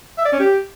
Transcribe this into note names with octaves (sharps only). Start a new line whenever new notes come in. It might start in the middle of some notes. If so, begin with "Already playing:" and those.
E5
D5
C#4
G4